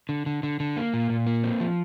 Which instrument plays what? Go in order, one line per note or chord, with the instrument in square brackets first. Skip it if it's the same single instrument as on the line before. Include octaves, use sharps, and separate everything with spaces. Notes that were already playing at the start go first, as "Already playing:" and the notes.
[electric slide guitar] D3
D3
D3
D3
A#3
A#2
A#2
A#3
C4
F3